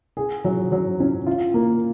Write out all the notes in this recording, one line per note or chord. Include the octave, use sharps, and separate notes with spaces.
G#4
F#3
F#3
C#4
F4
A#3